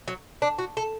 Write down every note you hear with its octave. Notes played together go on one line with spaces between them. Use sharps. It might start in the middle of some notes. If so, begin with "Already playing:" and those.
F#3
D4
F#4
A4